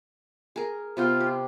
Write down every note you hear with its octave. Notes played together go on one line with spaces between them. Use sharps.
G#4 A#4
C3 B3 F4 G5
G4